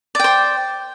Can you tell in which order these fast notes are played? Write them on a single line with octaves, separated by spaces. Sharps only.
D5 G5 C5